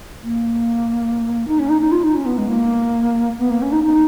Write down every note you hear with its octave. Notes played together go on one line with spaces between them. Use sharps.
A#3
D#4
C#4
D#4
D#4
F4
D#4
C#4
B3
G#3
A#3
B3
A#3
C#4
D#4
D#4